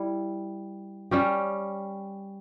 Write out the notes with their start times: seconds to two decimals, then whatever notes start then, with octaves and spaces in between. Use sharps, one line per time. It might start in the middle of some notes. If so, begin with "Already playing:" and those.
Already playing: G3 E4
1.11 G3 C#4 G4